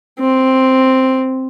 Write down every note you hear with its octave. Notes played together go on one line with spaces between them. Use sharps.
C4